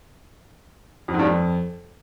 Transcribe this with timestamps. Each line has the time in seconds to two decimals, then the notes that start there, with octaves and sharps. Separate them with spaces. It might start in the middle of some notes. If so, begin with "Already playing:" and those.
1.08 F2
1.14 G#2
1.19 G2
1.25 F2